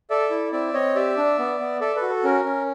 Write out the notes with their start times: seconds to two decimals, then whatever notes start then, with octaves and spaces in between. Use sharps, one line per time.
0.10 A4 D5 E5
0.31 E4
0.52 C4 D5 E5
0.74 C4 C#5 D#5
0.95 G4 D5 E5
1.17 D4
1.39 B3
1.60 B3
1.81 A4 D5 E5
1.96 A4 B4
2.02 F#4
2.09 A4
2.24 C#4 A#4
2.45 C#4